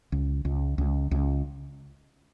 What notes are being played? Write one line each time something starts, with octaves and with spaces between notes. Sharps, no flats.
C#2
C#2
C#2
C#2